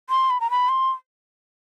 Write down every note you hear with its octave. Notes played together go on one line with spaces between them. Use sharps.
C6
B5
A#5
B5
C6